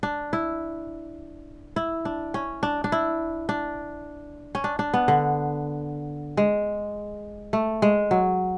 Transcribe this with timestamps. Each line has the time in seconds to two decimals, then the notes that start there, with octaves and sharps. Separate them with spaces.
0.03 D4
0.33 E4
1.76 E4
2.05 D4
2.34 C#4
2.63 D4
2.84 D4
2.92 E4
3.49 D4
4.55 C#4
4.64 D4
4.79 D4
4.94 B3
5.08 D3
6.37 G#3
7.53 A3
7.82 G#3
8.11 F#3